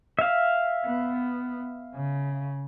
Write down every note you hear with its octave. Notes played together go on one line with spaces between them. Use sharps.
E5 F5
B3
C#3